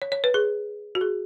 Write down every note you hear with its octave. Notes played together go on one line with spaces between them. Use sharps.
C#5
C#5
B4
G#4
F#4
G#4